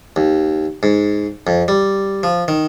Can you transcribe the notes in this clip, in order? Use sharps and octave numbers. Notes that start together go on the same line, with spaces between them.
D#2
G#2
F2
G3
F3
D#3